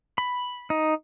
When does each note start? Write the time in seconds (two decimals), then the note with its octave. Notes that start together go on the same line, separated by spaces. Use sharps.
0.18 B5
0.70 D#4